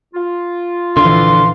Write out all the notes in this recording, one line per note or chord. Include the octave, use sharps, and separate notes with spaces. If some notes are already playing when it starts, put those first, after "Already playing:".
F4
A#1 D3 E3 F5 C6